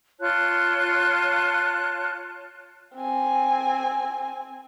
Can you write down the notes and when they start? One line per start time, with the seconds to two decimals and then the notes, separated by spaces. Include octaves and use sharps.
0.20 F4 C#5 A5 F#6
2.97 C4 G#5